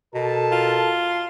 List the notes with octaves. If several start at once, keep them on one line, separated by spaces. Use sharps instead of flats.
B2 A4 A#4 A5
F4